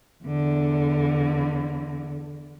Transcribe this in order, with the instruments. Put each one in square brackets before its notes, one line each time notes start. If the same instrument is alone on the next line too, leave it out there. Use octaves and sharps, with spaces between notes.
[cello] E2 D3